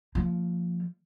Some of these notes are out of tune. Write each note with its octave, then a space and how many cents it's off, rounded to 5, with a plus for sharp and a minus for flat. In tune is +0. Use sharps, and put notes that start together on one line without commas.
F3 +0 A#3 -35